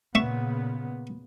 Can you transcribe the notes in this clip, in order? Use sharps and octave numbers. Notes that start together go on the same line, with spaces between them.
A#2 C#3 B3 E5 C#6